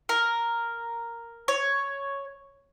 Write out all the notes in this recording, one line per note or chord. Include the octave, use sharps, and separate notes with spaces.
A#4
C#5